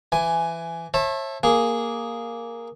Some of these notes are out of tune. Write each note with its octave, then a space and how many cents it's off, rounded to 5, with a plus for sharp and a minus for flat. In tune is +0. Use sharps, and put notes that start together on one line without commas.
E3 +20 G#5 +0
C#5 -40 E5 +0 A5 +0
A#3 +0 G#4 +0